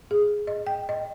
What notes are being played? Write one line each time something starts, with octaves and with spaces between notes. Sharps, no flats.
G#4
D#5
G5
D#5